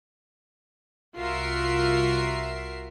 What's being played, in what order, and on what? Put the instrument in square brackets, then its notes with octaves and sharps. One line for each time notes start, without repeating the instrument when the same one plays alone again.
[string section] C2 F4 F#4 A#4 E5 C7